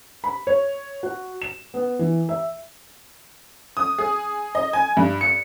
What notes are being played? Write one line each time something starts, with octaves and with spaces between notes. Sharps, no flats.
B5
C#5
F#4
E7
B3
E3
E5
D#6
G#4
D#5
G#5
G2
C#7